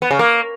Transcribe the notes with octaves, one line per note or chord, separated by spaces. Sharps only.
B3
C#3
A#3